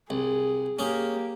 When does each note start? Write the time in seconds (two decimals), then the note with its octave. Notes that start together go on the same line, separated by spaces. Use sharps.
0.10 C2 G#4
0.79 A#3 C#4 G4 G#4